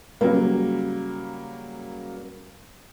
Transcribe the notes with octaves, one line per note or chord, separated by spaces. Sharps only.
C#3 F#3 G3 A#3